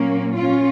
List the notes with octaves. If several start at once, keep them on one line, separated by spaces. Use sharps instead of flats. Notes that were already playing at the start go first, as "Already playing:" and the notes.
Already playing: A#2 F#3 A#3 C#4
C#4 F4